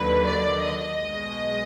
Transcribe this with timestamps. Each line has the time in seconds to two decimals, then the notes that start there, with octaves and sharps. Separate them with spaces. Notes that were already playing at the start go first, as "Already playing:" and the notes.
Already playing: D#2 D3 F#3 B4
0.27 D5
0.62 D#5
0.98 B1 B2 G#3